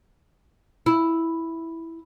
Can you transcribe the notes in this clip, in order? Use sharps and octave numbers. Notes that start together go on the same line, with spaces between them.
E4